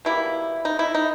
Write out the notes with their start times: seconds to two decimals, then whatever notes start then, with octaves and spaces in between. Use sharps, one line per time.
0.05 B2 G3 A#3 E4
0.65 D#4
0.79 E4
0.94 D#4